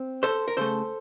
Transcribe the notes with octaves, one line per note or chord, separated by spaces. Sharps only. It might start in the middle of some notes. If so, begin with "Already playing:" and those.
Already playing: C4
A4 C5
A#4
C#3 A3 A4 C5